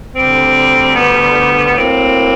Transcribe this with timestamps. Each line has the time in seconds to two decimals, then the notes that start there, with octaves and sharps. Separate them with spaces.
0.15 D2 D3 G3 C4
0.96 B3
1.76 A2 F#3 A#3 C4